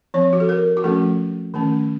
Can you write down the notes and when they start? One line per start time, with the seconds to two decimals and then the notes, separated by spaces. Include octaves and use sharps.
0.14 F3 C4 C#5
0.33 F#4
0.40 A4
0.49 A#4
0.77 F#4
0.84 F3 A3 C#4 A4
1.54 D#3 A3 C#4